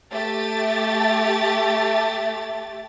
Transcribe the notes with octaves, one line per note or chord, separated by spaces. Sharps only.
A3 G4 A6